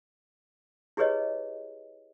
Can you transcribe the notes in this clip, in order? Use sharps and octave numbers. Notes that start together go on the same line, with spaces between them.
E4 G4 G#4 B4 C#5 D#5